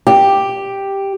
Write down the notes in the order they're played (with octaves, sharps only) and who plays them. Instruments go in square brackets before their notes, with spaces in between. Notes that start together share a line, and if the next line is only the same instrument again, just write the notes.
[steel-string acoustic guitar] G4